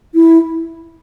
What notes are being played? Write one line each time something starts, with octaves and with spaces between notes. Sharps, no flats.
E4